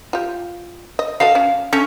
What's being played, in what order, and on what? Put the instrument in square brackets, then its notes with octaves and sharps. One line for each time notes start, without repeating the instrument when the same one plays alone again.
[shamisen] F4 G4
D#5
[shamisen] F#4 A4 D#5 [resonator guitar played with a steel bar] F5
[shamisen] C#4
[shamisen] A3 [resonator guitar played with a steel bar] C#4